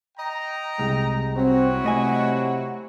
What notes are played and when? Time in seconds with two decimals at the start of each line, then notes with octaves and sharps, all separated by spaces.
0.18 D#5 G5 A#5
0.79 C2 G#3
1.36 F#3 C4 E4 F#4
1.84 C3 A3 D#5 G#5